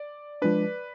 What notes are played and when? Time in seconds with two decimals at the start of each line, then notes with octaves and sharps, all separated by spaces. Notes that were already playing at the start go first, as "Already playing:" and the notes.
Already playing: D5
0.42 F3 G#3 D4 B4